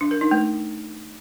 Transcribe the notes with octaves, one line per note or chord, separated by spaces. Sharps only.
D4
A#4
D#4
A3